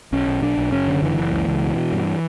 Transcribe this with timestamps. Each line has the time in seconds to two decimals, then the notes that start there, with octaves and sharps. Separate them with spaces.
0.12 B1 C#4
0.27 B1
0.42 B1 D4
0.57 B1
0.72 F#1 C#4
0.87 D3
1.02 F#1 E3
1.17 F#1
1.32 C#2
1.47 C#2
1.62 B2
1.77 B2
1.92 G2